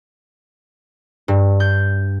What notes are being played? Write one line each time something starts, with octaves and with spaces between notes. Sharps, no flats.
G2
G6